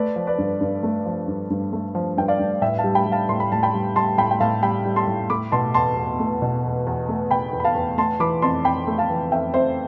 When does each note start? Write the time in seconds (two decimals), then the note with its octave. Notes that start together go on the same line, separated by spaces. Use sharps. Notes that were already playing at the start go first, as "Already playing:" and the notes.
Already playing: A3 B4 D5
0.16 F3
0.27 B4 D5
0.38 G2
0.61 G2
0.83 A3
1.05 F3
1.28 G2
1.50 G2
1.73 A3
1.95 F3
2.17 G2 G5
2.28 D5 F5
2.39 G2
2.62 A2 E5 G5
2.78 F5 A5
2.84 G3
2.95 G5 B5
3.06 G3
3.12 F5 A5
3.29 A2 C6
3.40 B5
3.52 A2 A5
3.63 G5 B5
3.73 G3
3.96 G3 A5 C6
4.18 A2 G5 B5
4.31 G5
4.40 A2 F5 A5
4.62 G3 G5 B5
4.85 G3
4.96 A5 C6
5.07 A2
5.30 A3 B5 D6
5.52 B2 A5 C6
5.74 E2 A5 C6
5.97 E2
6.20 A3
6.42 B2
6.64 E2
6.87 E2
7.09 A3
7.31 B2 G5 B5
7.53 E2
7.60 B5
7.64 F5 A5
7.75 E2
7.98 A3 A5 C6
8.20 E3 B5 D6
8.42 F2 A5 C6
8.65 F2 G5 B5
8.87 A3
8.98 F5 A5
9.10 E3
9.32 F2 E5 G5
9.54 F2 C5 E5